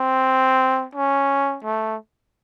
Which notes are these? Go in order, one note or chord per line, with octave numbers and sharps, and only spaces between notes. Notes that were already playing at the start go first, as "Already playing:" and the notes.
Already playing: C4
C#4
A3